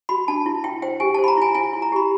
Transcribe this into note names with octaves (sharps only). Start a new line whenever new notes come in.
F#4 B5
D4 A5
E4
E4 G5
C5 G5
G4 G#5
C5 A5
B5
A#5
E4 G#5
E4 G#5
E4
A#5
G4 B5